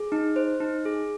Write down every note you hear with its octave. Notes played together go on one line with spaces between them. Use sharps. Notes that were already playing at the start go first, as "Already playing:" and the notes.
Already playing: G#4
D#4
C5
D#4
G#4